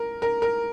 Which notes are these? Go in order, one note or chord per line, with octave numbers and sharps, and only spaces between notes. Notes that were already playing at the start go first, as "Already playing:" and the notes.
Already playing: A#4
A#4
A#4